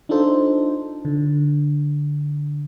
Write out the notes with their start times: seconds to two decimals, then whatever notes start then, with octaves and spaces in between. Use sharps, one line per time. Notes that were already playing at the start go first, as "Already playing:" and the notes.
0.09 D4 D#4 F4 A4 C5
1.05 D3